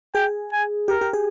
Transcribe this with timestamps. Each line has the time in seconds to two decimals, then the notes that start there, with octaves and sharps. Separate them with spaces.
0.15 G#4 G5
0.52 G#5
0.88 G4 A#4
1.01 G4
1.13 G#4